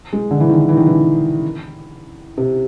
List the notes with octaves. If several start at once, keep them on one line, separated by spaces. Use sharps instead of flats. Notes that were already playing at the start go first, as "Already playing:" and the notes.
G#3
D3
E3
D#3
E3
D#3
E3
C3